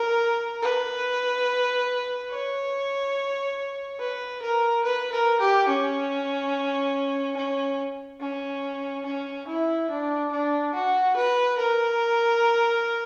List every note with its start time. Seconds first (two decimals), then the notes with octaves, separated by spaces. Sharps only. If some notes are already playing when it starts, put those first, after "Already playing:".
Already playing: A#4
0.62 B4
2.31 C#5
3.99 B4
4.42 A#4
4.84 B4
5.12 A#4
5.40 G4
5.68 C#4
7.37 C#4
8.21 C#4
9.05 C#4
9.47 E4
9.90 D4
10.32 D4
10.74 F#4
11.16 B4
11.58 A#4